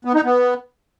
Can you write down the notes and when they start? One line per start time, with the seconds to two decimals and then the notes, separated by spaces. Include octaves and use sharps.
0.05 B3
0.15 D#4
0.24 B3